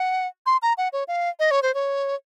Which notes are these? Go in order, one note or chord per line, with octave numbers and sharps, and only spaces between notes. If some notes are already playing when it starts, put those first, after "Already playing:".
Already playing: F#5
C6
A#5
F#5
C#5
F5
D#5
C#5
C5
C#5